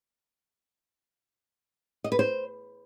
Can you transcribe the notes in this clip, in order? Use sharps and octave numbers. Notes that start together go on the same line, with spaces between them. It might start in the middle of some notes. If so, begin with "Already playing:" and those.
D#5
B4
C5